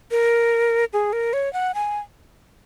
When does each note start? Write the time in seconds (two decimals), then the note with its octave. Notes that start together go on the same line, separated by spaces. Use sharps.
0.11 A#4
0.93 G#4
1.13 A#4
1.33 C#5
1.53 F#5
1.75 G#5